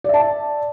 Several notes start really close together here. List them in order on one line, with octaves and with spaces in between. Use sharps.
D5 E5 A5